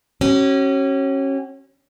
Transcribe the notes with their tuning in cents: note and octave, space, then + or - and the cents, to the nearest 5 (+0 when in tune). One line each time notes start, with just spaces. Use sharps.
C#4 -25 F#4 +45